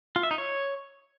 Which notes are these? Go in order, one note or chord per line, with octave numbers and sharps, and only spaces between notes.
F4
E5
D#4
C#5